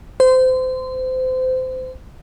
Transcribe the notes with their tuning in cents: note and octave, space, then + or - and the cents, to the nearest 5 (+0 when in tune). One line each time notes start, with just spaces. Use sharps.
C5 -25